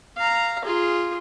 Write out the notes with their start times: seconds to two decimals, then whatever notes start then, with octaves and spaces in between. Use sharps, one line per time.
0.18 F5 A#5
0.64 F4 G#4